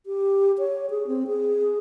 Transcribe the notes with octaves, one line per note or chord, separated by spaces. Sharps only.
G4
C#5
G#4
C4
G#4